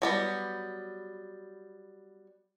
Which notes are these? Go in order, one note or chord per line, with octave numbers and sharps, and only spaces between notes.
F#3 G3 B3